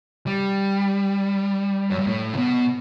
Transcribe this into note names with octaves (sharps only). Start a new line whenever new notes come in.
G3
F#2
G2
A2
C#3
B2